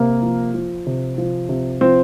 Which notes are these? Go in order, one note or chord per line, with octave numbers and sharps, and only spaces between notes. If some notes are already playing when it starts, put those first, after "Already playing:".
Already playing: C3 A#3
F3
F3
C3
F3
C3
F3 C4